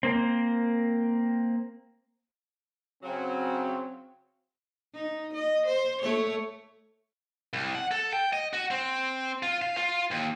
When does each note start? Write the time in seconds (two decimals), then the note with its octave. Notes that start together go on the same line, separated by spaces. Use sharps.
0.03 A#3 C4
3.03 C#3 F#3 C4
4.94 D#4
5.34 D#5
5.67 C5
6.02 A3 C#5
7.53 C2
7.75 F#5
7.91 A4
8.13 G5
8.33 D#5
8.53 F#4
8.71 C4
9.43 F4
9.62 F5
9.77 F4
10.11 D#2